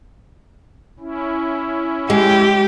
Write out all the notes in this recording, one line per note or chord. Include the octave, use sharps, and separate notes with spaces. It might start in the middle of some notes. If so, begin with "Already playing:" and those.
C#4 E4
G#3 G4